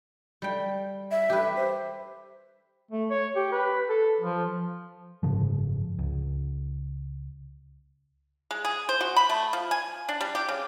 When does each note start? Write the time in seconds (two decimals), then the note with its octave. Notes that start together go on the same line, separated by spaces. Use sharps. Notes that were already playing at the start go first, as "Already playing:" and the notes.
0.42 G3 G5
1.11 E5
1.30 G4 B4
1.56 C5
2.91 A3
3.10 C#5
3.36 G4
3.52 B4
3.89 A4
4.21 F3
5.23 F#1 G#2 C#3 F3
5.99 C#2
8.51 G#3
8.65 G#4
8.89 C5
9.01 F#4
9.16 B5
9.29 A3
9.53 F3
9.71 G#5
10.09 D4
10.21 G3
10.35 G4
10.48 C#3